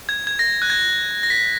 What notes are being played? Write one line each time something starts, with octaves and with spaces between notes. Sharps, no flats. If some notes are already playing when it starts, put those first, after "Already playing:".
G#6
G#6
A#6
F#6
G#6
A#6
B6